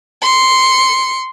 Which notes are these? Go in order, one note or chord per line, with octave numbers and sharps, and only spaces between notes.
C6 C#7